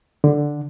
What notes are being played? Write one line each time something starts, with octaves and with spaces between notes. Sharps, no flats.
D3